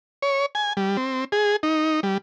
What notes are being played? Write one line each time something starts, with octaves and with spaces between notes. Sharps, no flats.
C#5
G#5
G3
C4
G#4
D#4
G3